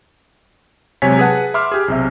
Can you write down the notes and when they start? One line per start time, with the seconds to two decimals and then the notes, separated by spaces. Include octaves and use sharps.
1.02 C3 F#3 G#3 C#5 G#5 B6
1.19 G#4 B4 F#5 A5
1.54 E5 B5 C6 D6 F6
1.72 G4 G#4
1.88 B1 C3 E5